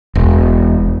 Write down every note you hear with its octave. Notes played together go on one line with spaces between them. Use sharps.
E1